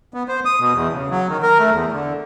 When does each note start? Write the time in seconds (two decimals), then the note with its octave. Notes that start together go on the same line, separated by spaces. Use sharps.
0.14 B3
0.28 C5
0.45 D#6
0.60 B2
0.74 E2
0.93 C#3
1.10 F#3
1.29 D#3
1.43 A#4
1.59 A3
1.72 E2
1.92 D3